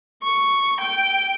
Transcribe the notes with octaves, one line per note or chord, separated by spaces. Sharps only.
C#6
G5